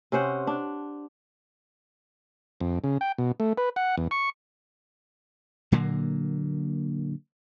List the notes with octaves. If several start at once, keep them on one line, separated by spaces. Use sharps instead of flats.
C3 C#4 C5 F#5
D4
F2
C#3
G5
B2
A3
B4
F#5
E2
C#6
A#2 D3 F#3 A#3